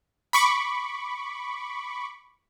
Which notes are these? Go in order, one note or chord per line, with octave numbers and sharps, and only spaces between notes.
B5 C#6 D6